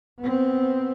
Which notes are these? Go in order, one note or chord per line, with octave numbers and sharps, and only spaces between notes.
B3 C4